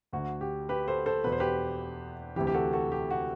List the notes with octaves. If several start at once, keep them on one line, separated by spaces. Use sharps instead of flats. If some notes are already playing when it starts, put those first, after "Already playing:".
D2 D3 F#4
G4
G4 B4
A4 C5
A4 C5
E2 B2 B4
C5
G4 B4
D2 C3 E3 G4
G4
F#4 A4
F#4 A4
G4
F#4